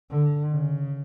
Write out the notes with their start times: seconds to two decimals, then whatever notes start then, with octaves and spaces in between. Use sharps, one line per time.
0.11 D3
0.53 C#3